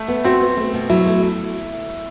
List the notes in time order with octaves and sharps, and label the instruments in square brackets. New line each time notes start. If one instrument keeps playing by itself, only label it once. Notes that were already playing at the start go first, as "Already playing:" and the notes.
Already playing: [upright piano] A3
[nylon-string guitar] B3
[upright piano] C4 [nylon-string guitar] F#4
[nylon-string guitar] B3
A3
B2
[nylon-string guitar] F#3 [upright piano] E4
[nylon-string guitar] A3
A3